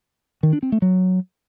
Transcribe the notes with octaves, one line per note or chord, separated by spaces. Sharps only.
D#3
D4
C4
A3
F#3